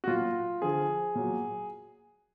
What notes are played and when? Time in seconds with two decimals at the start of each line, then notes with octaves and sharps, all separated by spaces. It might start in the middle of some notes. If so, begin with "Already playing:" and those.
0.04 F#4
0.07 A#2 F#3 F4
0.62 D3 F3 G#4
1.15 A#2 F#3